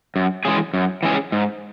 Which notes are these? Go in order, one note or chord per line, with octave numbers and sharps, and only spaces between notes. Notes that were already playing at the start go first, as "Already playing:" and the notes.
F#2
E3 G#3 C#4 G#4
F#2
E3 G#3 C#4 G#4
G#2